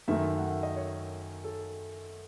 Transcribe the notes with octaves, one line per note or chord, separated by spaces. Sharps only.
F#2 D#3 A3 E5
F#5
E5
D#5
C#5
A4